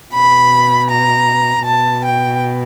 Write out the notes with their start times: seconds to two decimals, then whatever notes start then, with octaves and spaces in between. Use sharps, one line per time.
0.14 B2 B5
0.90 A#5
1.66 B2 A5
2.04 G5